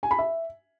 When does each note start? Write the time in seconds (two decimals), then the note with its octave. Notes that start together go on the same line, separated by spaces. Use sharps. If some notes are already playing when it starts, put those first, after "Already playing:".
0.03 G#5
0.11 B5
0.19 E5